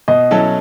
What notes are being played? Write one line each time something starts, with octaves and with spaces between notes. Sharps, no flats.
B2 D#5
F#3 C#4 E4 A4